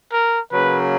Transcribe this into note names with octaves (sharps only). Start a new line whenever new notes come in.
A#4
C#3 F#3 A#3 B4